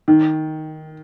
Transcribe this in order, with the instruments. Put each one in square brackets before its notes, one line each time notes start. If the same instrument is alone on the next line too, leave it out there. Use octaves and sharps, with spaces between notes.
[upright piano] D#3